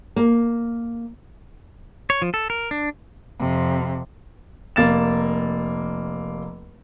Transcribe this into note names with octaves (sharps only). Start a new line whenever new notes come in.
A#3
C#5
F3
A4
A#4
D4
F2 C3
F1 A#3 A6 E7